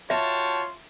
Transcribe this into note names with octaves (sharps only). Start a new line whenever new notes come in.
F4 F#4 C#5 E5 G5 A5